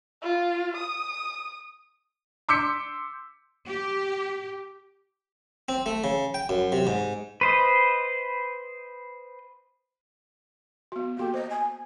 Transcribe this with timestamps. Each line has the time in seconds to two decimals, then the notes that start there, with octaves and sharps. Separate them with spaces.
0.23 F4
0.77 D#6
2.49 C6 D6 E6 G6 B6 C#7
3.67 G4
5.69 C4
5.86 A3
6.04 C#3
6.34 G5
6.49 F#2
6.72 C3
6.87 G#2
7.41 B4 C5 D#5
10.92 B3 F#4
11.17 A#3 F#4 G4 A4
11.34 C5 D#5
11.49 G#5